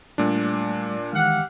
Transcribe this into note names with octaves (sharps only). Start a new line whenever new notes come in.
A#2 G3 A3 D4
D#3 E3 G#3 G4 F5 F#5